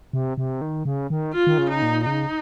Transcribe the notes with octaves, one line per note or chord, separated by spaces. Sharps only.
C3
C3
D#3
C#3
D#3
F4
D#3
C#3
D#4
A#2
C#3 D#4